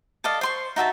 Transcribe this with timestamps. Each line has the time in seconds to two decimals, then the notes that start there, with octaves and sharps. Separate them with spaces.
0.24 A4 D5 D#5 F5
0.41 C5 C6 C#6
0.76 D#4 F#4 E5 A5